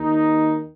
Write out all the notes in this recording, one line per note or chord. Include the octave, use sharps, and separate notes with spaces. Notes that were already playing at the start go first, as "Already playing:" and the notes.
Already playing: D#2 D#3 D#4